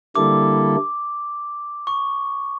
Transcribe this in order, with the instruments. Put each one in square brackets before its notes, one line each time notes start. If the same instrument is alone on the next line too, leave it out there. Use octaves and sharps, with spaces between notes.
[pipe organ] D3 G3 A#3 E4 A4 [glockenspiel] D6
[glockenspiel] C#6